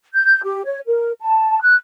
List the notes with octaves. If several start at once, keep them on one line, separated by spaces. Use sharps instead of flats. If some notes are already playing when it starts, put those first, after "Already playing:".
G6
G4
C#5
A#4
A5
F#6